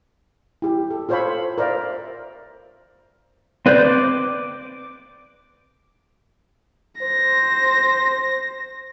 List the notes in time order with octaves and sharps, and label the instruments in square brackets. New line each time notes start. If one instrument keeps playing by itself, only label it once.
[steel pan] E4 G4
A4
F4 A4 C5 C#5 F5 B5
A#4 C5 D5 E5 F5
[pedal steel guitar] C4 B4 C5 D5 G6
D6
[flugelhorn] C5 [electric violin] A#6